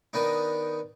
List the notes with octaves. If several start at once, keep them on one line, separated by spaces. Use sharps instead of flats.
D#3 B3 D4 D#4